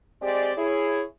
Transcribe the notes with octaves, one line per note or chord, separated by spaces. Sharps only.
G#3 C4 G4 D5
E4 G#4 C#5